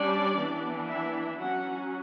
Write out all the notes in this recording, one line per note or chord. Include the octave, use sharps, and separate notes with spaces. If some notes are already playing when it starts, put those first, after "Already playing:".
Already playing: G3 C#4 D4 D5
E3 B3 D4
E4 E5
F#3 C#4 F#4 F#5